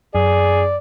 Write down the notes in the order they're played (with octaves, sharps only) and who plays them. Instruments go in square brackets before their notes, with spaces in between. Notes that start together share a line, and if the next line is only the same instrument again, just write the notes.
[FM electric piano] F#2 [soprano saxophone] G#4 [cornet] D5